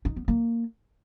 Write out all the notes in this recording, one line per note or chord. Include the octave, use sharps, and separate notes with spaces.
D#4
B3
A#3